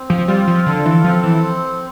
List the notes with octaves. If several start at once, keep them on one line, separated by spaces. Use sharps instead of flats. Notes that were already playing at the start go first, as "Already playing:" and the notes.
Already playing: C4
F3
G3 F4
F3
D3 A4
E3
F3 C4
E3